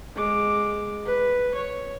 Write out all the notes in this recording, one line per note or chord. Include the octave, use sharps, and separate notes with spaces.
G#3 D6
B4
C#5